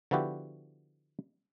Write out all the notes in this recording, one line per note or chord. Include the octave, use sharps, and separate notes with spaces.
D3 F3 B3 E4 F#4 G4